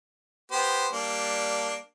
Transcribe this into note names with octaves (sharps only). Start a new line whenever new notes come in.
B3 G4 C5
G3 A#3 D4